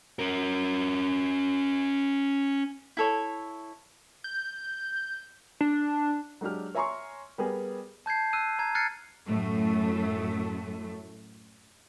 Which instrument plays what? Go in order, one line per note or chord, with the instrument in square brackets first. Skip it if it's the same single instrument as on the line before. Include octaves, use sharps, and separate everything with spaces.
[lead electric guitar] C#4 A#4
[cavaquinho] E4 A4 C#5
[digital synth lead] G6
D4
[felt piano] F#3 G#3 D4 G4 F6
C#5 E5 G#5 A#5 C6 C#6
G3 B3 G#4 A#4
[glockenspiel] A5 G6 G#6 C7
E6 F#6 D#7
A#5 G#6
F6 F#6 G#6 A6 C7 C#7
[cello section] F#2 A2 A3